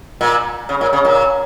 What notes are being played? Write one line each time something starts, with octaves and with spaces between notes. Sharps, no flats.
A#2
C#3
A#2
C#3
A#2